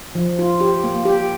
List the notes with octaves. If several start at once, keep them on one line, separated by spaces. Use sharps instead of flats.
F3
F4
G4
A#3
G4